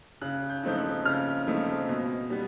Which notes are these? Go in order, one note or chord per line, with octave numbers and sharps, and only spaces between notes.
C#3 F#6
G6
F3 A3 C4 D#4 G6
F#6
C#3 F6
F3 A3 C4 D#4
B2
G3 B3